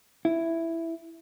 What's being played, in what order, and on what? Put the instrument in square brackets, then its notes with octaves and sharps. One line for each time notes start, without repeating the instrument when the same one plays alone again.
[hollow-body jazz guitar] E4